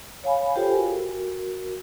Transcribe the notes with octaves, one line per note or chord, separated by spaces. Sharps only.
C#5 F5 G#5 B5
F4 G4 A4 C5 G5 G#5
F#4 A#4